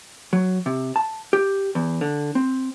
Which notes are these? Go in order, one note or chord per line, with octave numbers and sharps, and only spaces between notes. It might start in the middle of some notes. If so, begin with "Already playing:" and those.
F#3
C3
A5
G4
E2
D3
C4